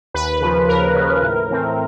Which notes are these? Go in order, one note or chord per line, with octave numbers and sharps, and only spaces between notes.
D#2 B4
C#3 F3
D#2 A#4
C#3 F3
A2
E3 A3 C4